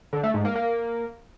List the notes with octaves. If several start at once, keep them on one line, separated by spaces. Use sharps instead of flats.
D3
A3
G#2
A#3
A#3